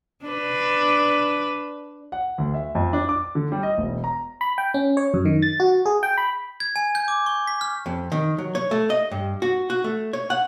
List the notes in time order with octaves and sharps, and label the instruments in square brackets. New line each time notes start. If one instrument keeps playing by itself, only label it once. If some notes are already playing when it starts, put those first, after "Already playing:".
[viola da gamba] D4 B4
[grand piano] F#5
D2
E5
F2
D4
D6
D3
G3
D#5
E1
A#5
[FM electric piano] B5
G5
C#4
C#5
F#2
D#3
A6
F#4
G#4
G5
B5
[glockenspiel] G#6
G#5
G6
D6
C#6
B6
F6
[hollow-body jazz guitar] F2
D#3
F#3
C#5
A3
D#5
G2
F#4
F#4
A3
C#5
F#5